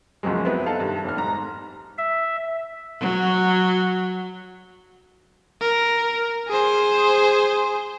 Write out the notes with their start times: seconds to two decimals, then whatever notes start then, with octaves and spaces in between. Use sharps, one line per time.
0.23 C#2 F#2 F3 F#3 G#3
0.45 B3 C4 E4 B4
0.66 D#4 A4 F5 A5
0.80 G2 D#3
1.04 F1 F6
1.17 G#2 A#5
1.98 E5
3.00 F#3
5.61 A#4
6.48 G#4 C5